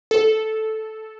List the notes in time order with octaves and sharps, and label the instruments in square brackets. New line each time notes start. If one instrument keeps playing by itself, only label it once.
[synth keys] A4